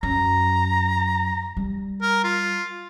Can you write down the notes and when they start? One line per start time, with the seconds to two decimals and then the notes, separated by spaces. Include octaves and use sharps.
0.03 F#2 A#5
1.57 G3
2.02 A#4
2.24 F4